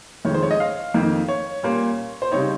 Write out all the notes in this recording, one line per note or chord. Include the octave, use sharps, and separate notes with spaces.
F2 D#3 G#3 C#4 C#5
C5
C#5
D#5
F5
F2 D#3 A#3 D#4
C#5
A#2 G3 A#3 C#4
C5
C#3 G3 C4 D#4 C#5